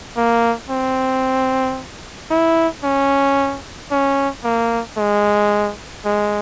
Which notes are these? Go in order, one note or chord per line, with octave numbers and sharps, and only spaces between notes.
A#3
C4
E4
C#4
C#4
A#3
G#3
G#3